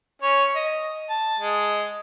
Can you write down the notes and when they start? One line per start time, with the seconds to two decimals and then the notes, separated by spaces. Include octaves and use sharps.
0.22 C#4 C#5
0.56 D#5
1.09 A5
1.40 G#3